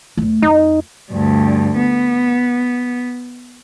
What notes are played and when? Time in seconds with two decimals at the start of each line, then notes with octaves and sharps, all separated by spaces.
0.17 E2 A3
0.42 F2 D#4
1.11 D2 G2
1.76 B3